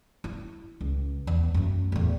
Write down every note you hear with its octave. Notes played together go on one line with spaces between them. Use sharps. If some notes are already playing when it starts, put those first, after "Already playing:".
E4
C#2
E2 B3
F#2 A3
A1 E2